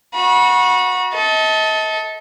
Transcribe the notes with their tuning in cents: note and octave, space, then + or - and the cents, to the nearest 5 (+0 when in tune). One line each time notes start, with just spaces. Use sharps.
F#4 -20 B5 -35
A4 -5 D#5 +40